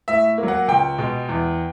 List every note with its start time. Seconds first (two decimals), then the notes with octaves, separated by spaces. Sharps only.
0.08 A2 E5
0.38 A#3
0.43 F#3
0.48 F#5
0.68 C#2 G5
0.98 B2 G#3
1.29 E2